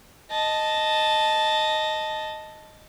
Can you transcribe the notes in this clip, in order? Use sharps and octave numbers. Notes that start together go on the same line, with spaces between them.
D#5 A5